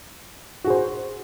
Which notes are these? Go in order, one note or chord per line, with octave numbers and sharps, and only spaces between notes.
F#4 G#4 C5